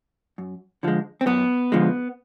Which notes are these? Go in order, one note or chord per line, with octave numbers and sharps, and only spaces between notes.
F#2
D3 F3 G#3
C4
F#2 B3
D3 F3 G#3